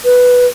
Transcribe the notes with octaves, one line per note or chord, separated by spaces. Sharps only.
B4